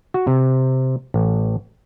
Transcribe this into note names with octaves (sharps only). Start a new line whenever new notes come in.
F#4
C3
A1